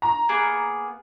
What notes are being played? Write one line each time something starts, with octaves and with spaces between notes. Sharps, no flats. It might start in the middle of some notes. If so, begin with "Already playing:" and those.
A#5
A#3 B3 G#4